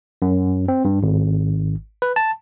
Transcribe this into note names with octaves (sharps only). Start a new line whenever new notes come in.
F#2
C4
G2
G#1
B4
A5